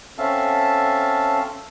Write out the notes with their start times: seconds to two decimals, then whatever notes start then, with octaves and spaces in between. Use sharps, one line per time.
0.18 C4 C#4 A4 E5 F5 A5